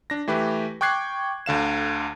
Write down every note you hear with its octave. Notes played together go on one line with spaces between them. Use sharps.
D4 A#6
E3 A3 G4 B4
G5 C#6 D6 F#6 G#6 C7
D2 D3 F5 E7